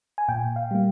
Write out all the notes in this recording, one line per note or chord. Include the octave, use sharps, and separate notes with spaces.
G#5
A#2 G5
F5
G3 A#3